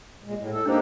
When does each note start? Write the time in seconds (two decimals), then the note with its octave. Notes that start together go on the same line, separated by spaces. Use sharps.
0.24 A#2 G#3
0.37 A2
0.52 A4
0.66 A#3 D4 D#4 G4 C5